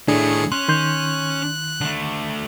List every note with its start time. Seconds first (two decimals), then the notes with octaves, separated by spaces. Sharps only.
0.08 A2 D#3 A3 D4 G#4 C#7
0.52 C#4 C6 F#6
0.68 D#3 C6 G6
1.81 D3 A3